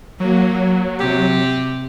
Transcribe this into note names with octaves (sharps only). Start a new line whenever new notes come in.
F#3 A#3
C3 G4